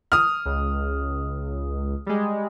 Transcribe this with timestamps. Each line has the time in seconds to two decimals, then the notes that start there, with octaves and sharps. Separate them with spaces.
0.12 D#6 F6
0.45 C#2
2.06 G3 G#3